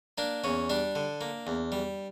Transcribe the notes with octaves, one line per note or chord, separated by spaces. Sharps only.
A#3 D4
E2 C#4
G3 D4
D3
A#3
E2
G3